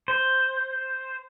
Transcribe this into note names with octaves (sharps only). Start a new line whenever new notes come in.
C5